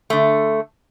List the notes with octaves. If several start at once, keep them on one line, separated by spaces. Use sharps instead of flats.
D3 A3